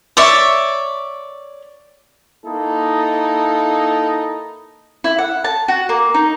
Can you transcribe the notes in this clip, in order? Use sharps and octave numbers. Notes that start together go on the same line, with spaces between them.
C#5 D5 E5
A#3 D#4 E4 A4
E4
F#5
A5
F#4
A#3
D#4